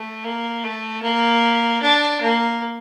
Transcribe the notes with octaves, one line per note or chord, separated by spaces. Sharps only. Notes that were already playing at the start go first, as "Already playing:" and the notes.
Already playing: A3
A#3
A3
A#3
D4
A#3